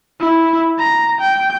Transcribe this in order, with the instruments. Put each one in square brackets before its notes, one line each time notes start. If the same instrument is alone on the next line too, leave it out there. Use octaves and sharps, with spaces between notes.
[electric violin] E4
A#5
G5